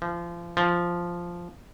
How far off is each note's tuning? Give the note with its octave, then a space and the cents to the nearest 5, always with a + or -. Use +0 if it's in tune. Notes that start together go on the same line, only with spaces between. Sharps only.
F3 -30
F3 -5